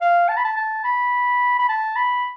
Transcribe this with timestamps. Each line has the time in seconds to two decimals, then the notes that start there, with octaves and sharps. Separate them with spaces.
0.01 F5
0.29 A5
0.37 B5
0.44 A5
0.57 A5
0.84 B5
1.59 B5
1.69 A5
1.96 B5